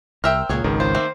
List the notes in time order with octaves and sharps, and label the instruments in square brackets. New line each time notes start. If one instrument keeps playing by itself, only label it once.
[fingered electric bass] C2 [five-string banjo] A#4 C5 E5 [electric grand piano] G5 E6 F6
[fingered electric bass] C#2 A#2 [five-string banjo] F#3 G#4 C#5
[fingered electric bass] G#1 C#2 [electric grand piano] D#3
[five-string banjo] F4 [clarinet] C5
[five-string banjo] A3 A#3 C4